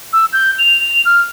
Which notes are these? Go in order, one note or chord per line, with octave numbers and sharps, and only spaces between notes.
E6
G6
F7
F6